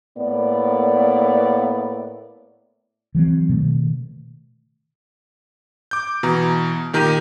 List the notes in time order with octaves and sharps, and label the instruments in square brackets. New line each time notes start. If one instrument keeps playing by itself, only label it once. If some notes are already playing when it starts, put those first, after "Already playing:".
[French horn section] A2 A#3 B3 D5
[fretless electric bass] E3 F#3 G#3 C4
B2 D#3 A3
[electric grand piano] D6 G6
B2 E3 A#5
A#2 D#3 G4 A#5 G6 D#7